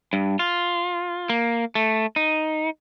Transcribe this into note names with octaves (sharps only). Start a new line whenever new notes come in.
G2
F4
A#3
A3
D#4